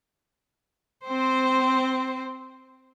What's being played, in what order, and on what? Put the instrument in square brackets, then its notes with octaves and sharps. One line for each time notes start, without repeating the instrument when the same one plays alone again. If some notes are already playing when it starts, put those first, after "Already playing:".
[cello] C4 C5